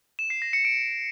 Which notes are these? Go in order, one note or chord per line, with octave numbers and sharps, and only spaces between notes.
E7
C7
A#6
C#7
D7